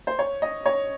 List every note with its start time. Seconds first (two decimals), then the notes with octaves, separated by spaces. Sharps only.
0.07 C5
0.19 C#5
0.42 D#5
0.66 C#5